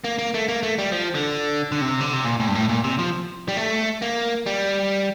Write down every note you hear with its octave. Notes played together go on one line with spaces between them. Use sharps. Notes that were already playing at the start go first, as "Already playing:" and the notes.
A#3
A#3
A3
A#3
A3
G3
F3
D3
D3
C3
D3
C3
A#2
A2
G2
A2
A#2
C3
F3
G3
A3
A#3
G3